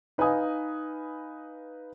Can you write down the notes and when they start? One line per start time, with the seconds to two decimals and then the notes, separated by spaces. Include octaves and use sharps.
0.18 D#4 B4 D#5 F5 G#5 D#6